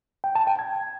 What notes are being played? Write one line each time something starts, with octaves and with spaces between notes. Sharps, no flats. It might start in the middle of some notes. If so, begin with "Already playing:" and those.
G5
A5
G5
G#6